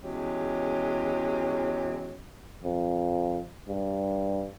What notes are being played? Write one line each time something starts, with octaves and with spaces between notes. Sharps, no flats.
E2 F#3 G#3 C#4 G4
F2
G2